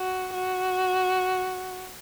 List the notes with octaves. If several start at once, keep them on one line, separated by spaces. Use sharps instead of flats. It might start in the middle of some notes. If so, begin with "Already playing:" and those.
Already playing: F#4
F#4